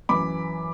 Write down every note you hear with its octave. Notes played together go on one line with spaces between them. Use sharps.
F#2 E3 B5 D6